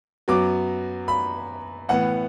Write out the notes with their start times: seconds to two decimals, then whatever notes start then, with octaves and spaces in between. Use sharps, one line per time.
0.28 F#2 F#3 B3 D6
1.08 B5
1.89 A2 E3 B3 F#5